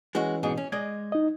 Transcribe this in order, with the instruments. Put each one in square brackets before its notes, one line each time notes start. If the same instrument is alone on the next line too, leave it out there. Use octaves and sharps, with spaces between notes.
[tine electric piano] E3 C#4 [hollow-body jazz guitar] G#3 F#4
[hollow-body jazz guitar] G#2 B2 G#4
C#4
[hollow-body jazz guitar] G#3 D5 D#5 [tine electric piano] G#6
[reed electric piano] D#4 D#5